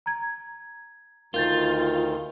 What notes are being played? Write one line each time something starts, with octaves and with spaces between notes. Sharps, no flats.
A#5 G#6
D2 D#3 F4 A#4 G6 A6